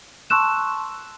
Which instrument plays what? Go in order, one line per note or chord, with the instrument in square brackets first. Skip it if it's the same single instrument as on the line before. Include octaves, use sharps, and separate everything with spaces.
[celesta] A5 C6 C#6 E6 F#6 E7